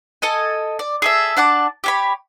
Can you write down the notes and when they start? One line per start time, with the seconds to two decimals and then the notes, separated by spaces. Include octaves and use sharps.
0.22 A4 D#5 G#5
0.79 D5
1.02 G#4 A4 E5
1.37 D4 F#5 A5 D6
1.84 G4 C#5 B5